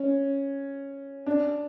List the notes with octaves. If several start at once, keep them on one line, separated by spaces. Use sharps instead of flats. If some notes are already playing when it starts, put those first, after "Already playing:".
Already playing: C#4
D4